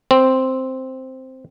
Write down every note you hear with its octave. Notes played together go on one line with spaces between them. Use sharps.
C4